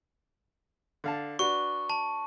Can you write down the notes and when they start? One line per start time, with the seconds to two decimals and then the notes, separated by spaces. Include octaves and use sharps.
1.04 D3 F5 A5
1.39 D4 F#4 B4 C#6
1.90 A5